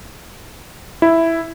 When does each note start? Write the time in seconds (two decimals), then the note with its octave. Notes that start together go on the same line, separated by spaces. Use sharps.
1.02 E4